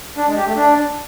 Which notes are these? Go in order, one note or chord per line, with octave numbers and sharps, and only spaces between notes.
D4
G#3
G4
A3
D4